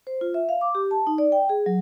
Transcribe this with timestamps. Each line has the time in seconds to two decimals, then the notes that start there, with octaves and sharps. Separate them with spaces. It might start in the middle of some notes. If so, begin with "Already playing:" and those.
0.07 C5
0.21 F4
0.34 E5
0.49 F5
0.61 D6
0.75 G4
0.91 A5
1.07 D#4
1.18 D5
1.32 G5
1.49 G#4
1.66 F#3